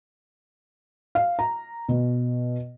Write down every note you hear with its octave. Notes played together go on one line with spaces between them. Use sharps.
F5
A#5
B2